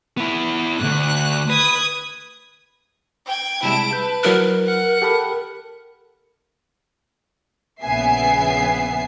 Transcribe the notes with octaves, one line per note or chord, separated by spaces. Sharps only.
B3 E4
D2 G#2 F#6
B4 D#6 G#6
G5 G#6
C3 G3 G#3 E4 A5 D7
B4 G6
F#3 E4 A#4 F#6
F#5
G4 A4 B5
A#1 C#3 B3 E5 G#5 C7